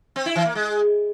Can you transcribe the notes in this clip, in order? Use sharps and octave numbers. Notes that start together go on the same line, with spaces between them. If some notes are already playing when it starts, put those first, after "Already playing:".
C4
E4
E3
A#3
G#3